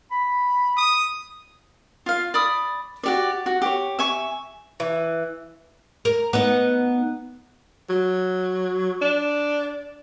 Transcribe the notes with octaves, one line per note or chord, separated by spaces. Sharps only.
B5
D#6
F4 F5
D5 B5 D#6
F#4 G4 D5
F#4
G4 C#5
E5 G#5 C#6
E3
A#4
B3 D#4
F#3
D4